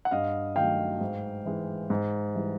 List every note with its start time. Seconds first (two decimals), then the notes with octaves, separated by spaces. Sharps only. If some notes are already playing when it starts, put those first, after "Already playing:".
0.05 F#5
0.11 G2 D#5 F5
0.56 D#3 F#3 A3 F5 G5
1.01 G#2
1.46 E3 G#3
1.90 G#2
2.35 E3 G3